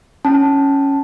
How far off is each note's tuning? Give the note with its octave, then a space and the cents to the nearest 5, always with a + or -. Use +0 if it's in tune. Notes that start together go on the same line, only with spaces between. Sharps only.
C#4 +0 A5 +0